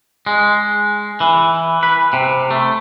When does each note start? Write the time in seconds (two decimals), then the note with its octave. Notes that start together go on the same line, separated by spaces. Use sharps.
0.27 G#3
1.20 E3
1.83 B4
2.13 C3
2.51 A3